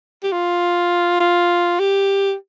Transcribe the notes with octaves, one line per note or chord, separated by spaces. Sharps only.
G4
F4
F4
G4